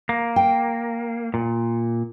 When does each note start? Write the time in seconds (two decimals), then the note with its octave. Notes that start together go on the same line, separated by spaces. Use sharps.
0.09 A#3
0.36 G5
1.34 A#2